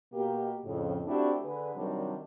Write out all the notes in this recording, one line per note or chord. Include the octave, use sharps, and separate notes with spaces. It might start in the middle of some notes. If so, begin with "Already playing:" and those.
B2 A#3 G4
F2 A2 C#3
A3 C4 D4 E4 F#4 G4
D3 G#4 B4
C3 D#3 F#3 G3 D4 A#4